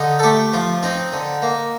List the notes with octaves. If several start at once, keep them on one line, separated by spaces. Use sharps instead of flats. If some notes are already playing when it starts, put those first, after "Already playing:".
Already playing: D3 D#4
A4
A3 G4
F3 F4
C4 D#4
D3
A#3